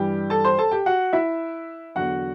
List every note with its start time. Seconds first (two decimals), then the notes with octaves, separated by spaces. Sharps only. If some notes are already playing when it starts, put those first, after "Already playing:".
Already playing: G2 E3 G3 G4
0.30 A4 A5
0.45 C5 C6
0.59 A4 A5
0.72 G4 G5
0.86 F#4 F#5
1.13 E4 E5
1.95 E2 D3 F#3 F#4 F#5